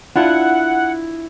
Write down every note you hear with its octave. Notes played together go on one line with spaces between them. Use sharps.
D4 E4 F4 F#5